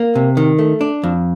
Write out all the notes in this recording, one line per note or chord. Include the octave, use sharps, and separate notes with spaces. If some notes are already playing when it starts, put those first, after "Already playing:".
Already playing: A#3
C3
D#3
A3
D4
F2